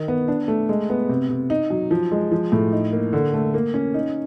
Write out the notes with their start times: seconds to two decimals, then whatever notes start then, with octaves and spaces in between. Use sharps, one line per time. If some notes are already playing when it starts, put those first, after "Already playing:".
Already playing: D#3
0.08 B3
0.28 D4
0.48 A3
0.69 G#3
0.90 B3
1.09 C3
1.30 C3
1.50 D#4
1.70 F#3
1.91 F3
2.12 G#3
2.32 F3
2.52 A2
2.72 D#4
2.93 A#3
3.13 D3
3.34 A3
3.54 A#3
3.74 C#4
3.94 D#4